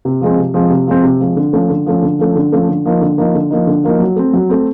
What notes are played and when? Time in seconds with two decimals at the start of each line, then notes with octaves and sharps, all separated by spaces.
0.05 C3
0.21 F3 G#3 C4
0.37 C3
0.54 F3 G#3 C4
0.70 C3
0.87 F3 G#3 C4
1.03 C3
1.20 F3 G#3 C4
1.36 D3
1.53 F3 A3 C#4
1.69 D3
1.86 F3 A3 C#4
2.02 D3
2.19 F3 A3 C#4
2.35 D3
2.52 F3 A3 C#4
2.69 D3
2.85 F3 A#3 D#4
3.01 D3
3.18 F3 A#3 D#4
3.35 D3
3.50 F3 A#3 D#4
3.67 D3
3.84 F3 A#3 D#4
4.00 F#3
4.16 A3 C4
4.33 F#3
4.49 A3 C4